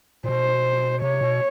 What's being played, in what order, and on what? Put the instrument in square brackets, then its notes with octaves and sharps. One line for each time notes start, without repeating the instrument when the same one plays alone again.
[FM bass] A#2
[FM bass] B2 [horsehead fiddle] C5
[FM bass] C3 [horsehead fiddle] C#5
[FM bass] B2